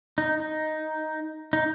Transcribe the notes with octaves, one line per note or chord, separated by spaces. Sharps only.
D#4
D#4
D#4